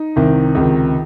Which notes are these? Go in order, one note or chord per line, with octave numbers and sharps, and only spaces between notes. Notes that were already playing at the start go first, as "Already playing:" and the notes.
Already playing: D#4
C2 C3 D#3
C#2 C3 D#3